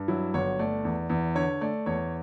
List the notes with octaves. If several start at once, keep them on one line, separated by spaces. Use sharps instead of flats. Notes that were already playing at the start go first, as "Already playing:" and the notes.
Already playing: G2
F#3 E4
G1 C#5
A3 D5
E2
E2
D3 C#5
A3 D5
E2 C#5